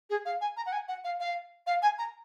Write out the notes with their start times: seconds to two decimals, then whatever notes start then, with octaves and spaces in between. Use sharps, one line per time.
0.09 G#4
0.25 F5
0.41 G#5
0.56 A#5
0.65 F#5
0.72 G#5
0.88 F#5
1.04 F5
1.19 F5
1.66 F5
1.82 G#5
1.98 A#5